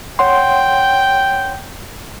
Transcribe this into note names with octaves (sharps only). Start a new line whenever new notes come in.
C#5 F#5 G5 C6